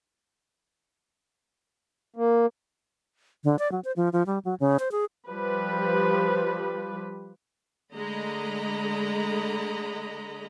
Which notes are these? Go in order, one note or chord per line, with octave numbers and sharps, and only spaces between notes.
A#3
D3
D5
F#3
C5
F3
F3
G3
F#3
C#3
C5
G#4
F3 G3 B4
D3 G#3 A3 D#5 A#5 B5